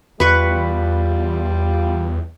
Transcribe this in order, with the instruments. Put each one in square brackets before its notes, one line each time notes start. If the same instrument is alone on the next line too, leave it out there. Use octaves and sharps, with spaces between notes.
[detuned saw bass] E2 [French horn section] G3 F4 [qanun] B4 C#6